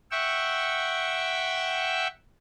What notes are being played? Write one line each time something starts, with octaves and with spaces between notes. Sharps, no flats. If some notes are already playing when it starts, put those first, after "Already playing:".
E5 F#5 G5 C#6 E6